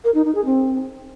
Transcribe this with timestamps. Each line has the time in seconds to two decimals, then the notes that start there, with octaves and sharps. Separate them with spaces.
0.04 A#4
0.14 D#4
0.25 D#4
0.35 G#4
0.45 C4